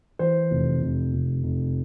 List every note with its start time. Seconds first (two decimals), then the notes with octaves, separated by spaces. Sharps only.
0.19 E3 C5
0.51 F1
0.82 F1
1.14 F1
1.44 F1